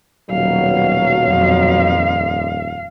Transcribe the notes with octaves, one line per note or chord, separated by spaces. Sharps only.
D#1 B2 F#3 F5
F2